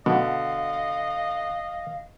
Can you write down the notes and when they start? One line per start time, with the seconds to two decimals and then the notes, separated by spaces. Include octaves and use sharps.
0.06 B2 D3 D#5 F5